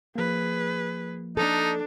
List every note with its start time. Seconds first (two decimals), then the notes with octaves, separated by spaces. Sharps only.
0.16 F3 A#3 G#4 B4
1.37 D4 D#4 A4